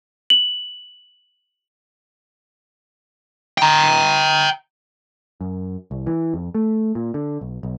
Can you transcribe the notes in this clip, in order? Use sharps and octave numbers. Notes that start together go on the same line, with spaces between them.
F#7
G5 A#5
F#2
C2
E3
F2
A3
A#2
D3
B1
B1